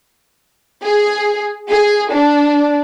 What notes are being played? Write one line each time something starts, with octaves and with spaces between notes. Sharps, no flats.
G#4
G#4
D4